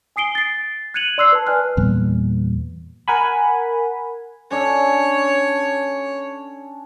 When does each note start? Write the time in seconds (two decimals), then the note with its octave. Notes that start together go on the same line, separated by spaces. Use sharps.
0.16 G#5 D#6 C7 D7 G7
0.35 A6 C7
0.94 F#6 G#6 C#7 D#7 F7 F#7
1.18 D5 C6 E6 F#6 C7
1.32 B4 A5
1.47 B4 D5 G#5 F6 F#6
1.77 E2 A#2 G3 B3
3.08 A#4 F#5 G#5 B5
4.51 C#4 D4 A4 C#5